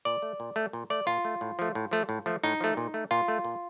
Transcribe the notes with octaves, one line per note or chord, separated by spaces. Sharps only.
A#2 D5
A3
A#2
A3
A#2
A3 D5
A#2 F4
A3
A2
F3 A3
A2
F3 A3
A2
F3 A3
A2 D#4
F3 A3
A#2
A3
A#2 F4
A3
A#2